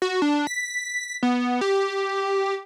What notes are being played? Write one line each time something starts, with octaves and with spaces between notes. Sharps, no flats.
F#4
D4
B6
B3
G4